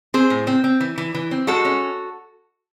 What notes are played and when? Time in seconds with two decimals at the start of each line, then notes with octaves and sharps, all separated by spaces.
0.14 C4 G#4 C5
0.30 A2
0.47 C4
0.64 C4
0.81 E3
0.98 E3
1.15 E3
1.31 C4
1.47 G#3 F#4 A4
1.65 C#4